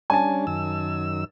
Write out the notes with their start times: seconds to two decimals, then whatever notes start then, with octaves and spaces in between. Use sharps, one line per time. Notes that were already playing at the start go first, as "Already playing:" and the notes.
0.10 G3 C#4 D4 G#5 A5
0.47 F#2 D#3 E6